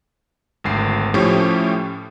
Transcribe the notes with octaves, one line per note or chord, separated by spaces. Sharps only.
G#1 D2 C7
A2 F3 A3 C#4 G4 C#6